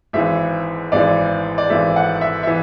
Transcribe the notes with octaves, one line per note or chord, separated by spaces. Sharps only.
G#1 G#2 E3 E5
G#1 G#2 E3 D5
D5
G#1 G#2 E3 E5
F#5
E5
E5
E3